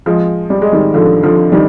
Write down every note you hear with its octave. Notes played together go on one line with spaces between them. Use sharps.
F3 G#3
G3
G#3
D#3 G3
D3 F3
D3 F3
D#3 G3